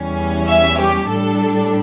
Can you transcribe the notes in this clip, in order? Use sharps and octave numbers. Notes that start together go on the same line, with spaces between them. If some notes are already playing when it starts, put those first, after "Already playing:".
Already playing: E2 E3 G3 C#4
E5
G4
A2 G3 D4 A4